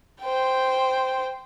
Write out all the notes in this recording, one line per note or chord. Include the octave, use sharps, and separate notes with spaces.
C5 G5